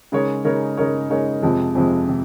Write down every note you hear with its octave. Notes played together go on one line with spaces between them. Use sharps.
C#3 G#3 D#4 A#4 C#5
C#3 G#3 D#4 A#4 C#5
C#3 G#3 D#4 A#4 C#5
C#3 G#3 D#4 A#4 C#5
F2 C3 F3 G#3
F2 C3 F3 G#3
C3